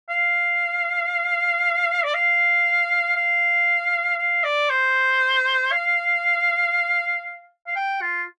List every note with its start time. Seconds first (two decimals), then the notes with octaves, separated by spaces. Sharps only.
0.09 F5
2.03 D5
2.14 F5
3.16 F5
4.18 F5
4.44 D5
4.69 C5
5.72 F5
7.67 F5
7.75 G5
8.01 F4